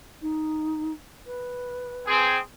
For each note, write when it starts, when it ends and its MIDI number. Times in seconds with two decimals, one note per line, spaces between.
0.21 0.92 63
1.26 2.27 71
2.07 2.39 60
2.07 2.39 68